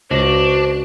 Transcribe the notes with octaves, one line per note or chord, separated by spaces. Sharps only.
C#2 D4 F#4 C5